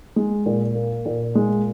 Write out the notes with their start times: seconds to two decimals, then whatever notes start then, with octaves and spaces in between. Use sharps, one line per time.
0.16 G#3
0.46 A#2
0.75 A#3
1.06 A#2
1.35 G#3